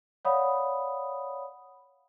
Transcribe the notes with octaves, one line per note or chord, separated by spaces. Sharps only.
C#5 D5 F5 F#5 B5 D#6